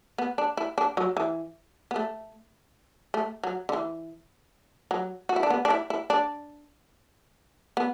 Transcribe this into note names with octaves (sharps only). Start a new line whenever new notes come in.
B3
D4
E4
D4
F#3
E3
B3
A3
A3
F#3
D3
E3
F#3
F#4
E4
D4
B3
D4
E4
E4
D4
B3